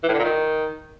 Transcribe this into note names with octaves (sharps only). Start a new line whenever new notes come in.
E3
A2
D3
A#2
D#3